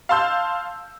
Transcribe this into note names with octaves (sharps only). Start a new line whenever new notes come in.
F5 A5 C6 E6 G6